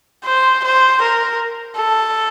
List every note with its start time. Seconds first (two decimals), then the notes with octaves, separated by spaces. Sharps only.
0.25 C5
0.64 C5
1.02 A#4
1.77 A4